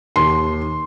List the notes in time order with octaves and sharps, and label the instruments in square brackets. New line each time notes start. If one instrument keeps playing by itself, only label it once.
[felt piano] D#2 C6